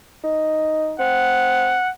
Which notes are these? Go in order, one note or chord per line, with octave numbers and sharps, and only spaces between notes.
D#4
C4 F#5